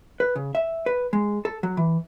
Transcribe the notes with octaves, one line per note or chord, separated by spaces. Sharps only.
B4
C#3
E5
B4
G#3
A4
F#3
E3